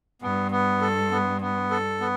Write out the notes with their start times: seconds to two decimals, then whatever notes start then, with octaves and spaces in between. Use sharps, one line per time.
0.22 G2 B3
0.51 B3
0.81 A4
1.11 B3
1.41 B3
1.71 A4
2.01 B3